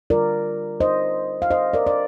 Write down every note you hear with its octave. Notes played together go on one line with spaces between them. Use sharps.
D3 G3 D4 F4 A#4 D5
C5 D#5
F5
C5 D#5
A#4 D5
D5